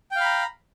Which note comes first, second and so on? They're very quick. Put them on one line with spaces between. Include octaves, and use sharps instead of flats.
G5 F5 B5 A#5